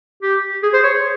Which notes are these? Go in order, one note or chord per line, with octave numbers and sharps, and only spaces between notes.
G4
G#4
C5
C#5